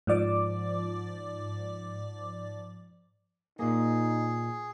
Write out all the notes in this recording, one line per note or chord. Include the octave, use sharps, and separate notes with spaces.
G#2 F3 D5 D6
A#2 A#3 D#4 G#4